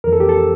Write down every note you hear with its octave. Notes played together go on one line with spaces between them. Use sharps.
F2 E3 A#4
A4
G4
A4